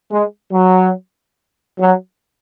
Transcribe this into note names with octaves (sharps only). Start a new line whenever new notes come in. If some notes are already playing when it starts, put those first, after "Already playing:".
G#3
F#3
F#3